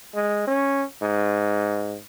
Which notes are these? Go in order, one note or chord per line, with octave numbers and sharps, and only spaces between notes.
G#3
C#4
G#2